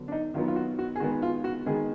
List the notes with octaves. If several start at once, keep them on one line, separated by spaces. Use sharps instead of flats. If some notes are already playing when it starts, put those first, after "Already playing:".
Already playing: D3 F#3 B3
D4
D#4
D#3 F#3 B3 F4
F4
F#4
F#4
G#4
D#3 G#3 B3 F#4
F4
F#4
D#3 G#3 B3 G#4